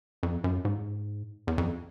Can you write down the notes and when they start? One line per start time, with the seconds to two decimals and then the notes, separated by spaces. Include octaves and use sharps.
0.23 F2
0.44 F#2
0.65 G#2
1.47 E2
1.58 F2